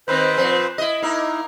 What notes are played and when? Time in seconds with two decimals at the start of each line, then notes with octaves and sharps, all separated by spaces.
0.08 D#2 D#3 C4 B4 C5
0.38 A#2 F3 C4
0.78 E4 D#5
1.02 A#3 D#4 E4 A#4